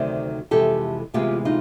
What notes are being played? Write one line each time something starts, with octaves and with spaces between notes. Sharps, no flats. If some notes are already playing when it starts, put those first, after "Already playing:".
Already playing: D2 C3 D#3 F#3 C5 D5
F2 C3 E3 G#3 G4 A4
D2 C3 E3 G#3 B3 F4 G4
D#4 F4